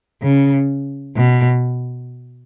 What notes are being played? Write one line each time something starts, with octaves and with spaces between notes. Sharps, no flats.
C#3
B2